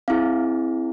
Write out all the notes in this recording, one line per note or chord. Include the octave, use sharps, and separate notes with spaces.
C4 E4 G#4 F5